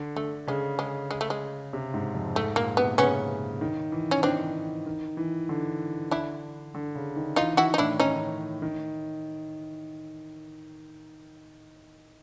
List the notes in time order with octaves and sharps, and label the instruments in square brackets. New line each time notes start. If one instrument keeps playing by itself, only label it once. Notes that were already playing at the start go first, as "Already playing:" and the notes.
Already playing: [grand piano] D3
[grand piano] D3 [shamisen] A3
[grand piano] C#3 [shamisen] G#3
[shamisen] G#3
G#3
A3
G#3
[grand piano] C3
G#2
F2
[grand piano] G#2 [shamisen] A3
[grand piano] A#2 [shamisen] A#3
[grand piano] C3 [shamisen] B3
[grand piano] C#3 [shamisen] B3 C#4
[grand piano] D#3
E3
[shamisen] C#4
[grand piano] D#3 [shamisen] C4 D4
[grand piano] D#3
E3
D3
[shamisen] D4 E4
[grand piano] D3
C#3
D#3
[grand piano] E3 [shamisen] D#4 F4
[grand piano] E3
[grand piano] D#3 [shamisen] E4 F#4
[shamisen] D#4
[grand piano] A2 [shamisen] D4 E4
[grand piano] D#3 [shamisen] C#4 D#4
[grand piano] D#3